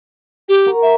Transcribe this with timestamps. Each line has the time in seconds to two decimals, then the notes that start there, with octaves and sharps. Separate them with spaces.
0.49 G4
0.66 F#4 A#4 A#5
0.82 E5